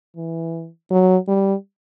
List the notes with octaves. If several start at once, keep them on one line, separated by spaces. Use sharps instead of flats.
E3
F#3
G3